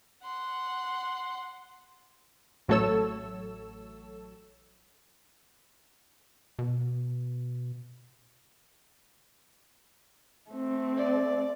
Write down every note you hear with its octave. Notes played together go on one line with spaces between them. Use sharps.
F#5 C6
A1 F#3 A3 A4 C#5 E6
B2
A3 C4
D5